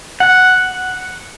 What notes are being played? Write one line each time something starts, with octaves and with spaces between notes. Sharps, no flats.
F#5